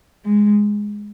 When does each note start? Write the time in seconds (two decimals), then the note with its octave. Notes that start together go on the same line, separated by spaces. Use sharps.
0.25 G#3